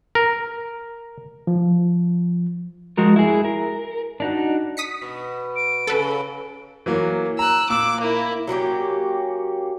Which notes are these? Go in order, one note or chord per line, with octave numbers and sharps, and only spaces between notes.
A#4
F3
F3 G#3 F#4 A#4
E4 G#4
A#4
D4 D#4 F#4
D#6 B6 C#7
B2
D7
C#3 F#3 A4 B4
E3 F#3 A#3
A#5 E6 F#6
A#2 D6 E6
A#3 E4
F#3 A#3 C#4 G4